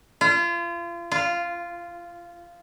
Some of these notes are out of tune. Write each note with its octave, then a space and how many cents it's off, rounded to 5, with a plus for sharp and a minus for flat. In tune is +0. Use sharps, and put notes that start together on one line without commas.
F4 -35
F4 -10